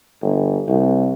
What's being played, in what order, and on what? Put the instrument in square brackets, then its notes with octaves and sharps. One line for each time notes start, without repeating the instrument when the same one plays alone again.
[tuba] G1
C2